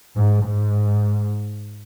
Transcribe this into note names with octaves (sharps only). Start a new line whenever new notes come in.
G#2
G#2